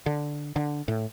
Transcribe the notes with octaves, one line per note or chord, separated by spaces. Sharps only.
D3
D3
A2